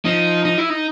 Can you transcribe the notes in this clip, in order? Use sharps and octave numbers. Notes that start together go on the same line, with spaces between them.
F3 D#4
D#4
E4
D#4